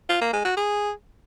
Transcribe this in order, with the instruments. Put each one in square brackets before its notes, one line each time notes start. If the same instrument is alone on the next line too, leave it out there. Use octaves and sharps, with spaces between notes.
[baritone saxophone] F4
A#3
G#3
F#4
G#4